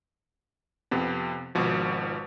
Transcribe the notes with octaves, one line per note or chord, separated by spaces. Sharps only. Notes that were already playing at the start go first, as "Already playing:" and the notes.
F2 C3 B3
G#1 B2 F3